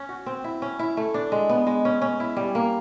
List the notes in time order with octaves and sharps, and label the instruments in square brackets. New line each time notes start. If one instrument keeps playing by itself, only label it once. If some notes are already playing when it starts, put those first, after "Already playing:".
Already playing: [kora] C#4
F#4
C4
E4
C#4
E4
A3
D4
G#3
B3
G#3
C#4
C#4
E4
G3
A#3